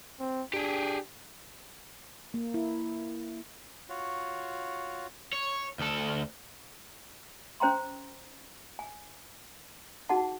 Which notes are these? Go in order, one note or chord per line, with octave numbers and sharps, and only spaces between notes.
C4
D4 G4 G#4
A#3
E4
F4 F#4 C#5
C#5
D2 A4
C#4 C5 G5 A#5 C6
G#5
D#4 F#4 G#4 F#5 A5